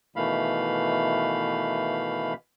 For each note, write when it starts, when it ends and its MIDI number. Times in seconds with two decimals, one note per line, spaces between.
0.16 2.33 47
0.16 2.33 51
0.16 2.33 52
0.16 2.33 57
0.16 2.33 77
0.16 2.33 83